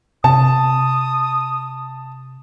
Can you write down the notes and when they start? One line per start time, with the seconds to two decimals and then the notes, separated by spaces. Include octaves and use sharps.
0.24 C3 A5 D#6